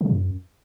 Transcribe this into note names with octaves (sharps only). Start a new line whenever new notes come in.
C#3
C3
F#2